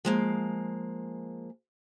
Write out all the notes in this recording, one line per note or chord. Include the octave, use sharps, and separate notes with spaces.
F3 G#3 A#3